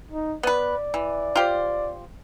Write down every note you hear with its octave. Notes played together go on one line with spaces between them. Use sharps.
D#4
B3 B4 D5
E3
F4 G4 C5